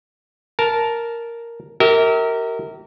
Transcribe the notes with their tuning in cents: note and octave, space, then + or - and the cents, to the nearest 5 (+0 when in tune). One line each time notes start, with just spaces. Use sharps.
A#4 +0 A5 -10
G4 -35 A#4 -15 E5 -40